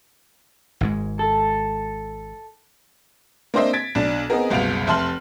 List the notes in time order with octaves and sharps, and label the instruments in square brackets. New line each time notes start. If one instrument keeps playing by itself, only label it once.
[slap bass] G#1 G#2 G#3
[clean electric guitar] A4
[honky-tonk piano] A#3 C4 D4 C5 D#5 E5
G#6 A6 B6 D7
B1 D4 E7
B3 C4 D#4 G#4 A#4
F#1 C2 B2 F5 D7 F7
F1 E5 A5 C6 F6 F#7